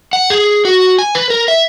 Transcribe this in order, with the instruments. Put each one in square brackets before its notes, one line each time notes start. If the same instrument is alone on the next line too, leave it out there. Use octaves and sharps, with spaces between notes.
[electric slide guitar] F#5
G#4
F#4
G#5
B4
A#4
E5